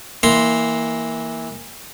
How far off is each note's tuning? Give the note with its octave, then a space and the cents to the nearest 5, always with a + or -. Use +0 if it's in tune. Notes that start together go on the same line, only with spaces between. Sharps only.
E3 -15 A#3 +0 C6 +0